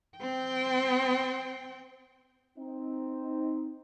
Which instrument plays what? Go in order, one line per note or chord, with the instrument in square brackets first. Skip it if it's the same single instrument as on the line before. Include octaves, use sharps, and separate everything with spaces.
[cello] C4 G5
[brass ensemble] C4 D#4